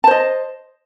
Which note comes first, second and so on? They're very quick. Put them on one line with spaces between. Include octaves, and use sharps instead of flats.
A5 C5 D#5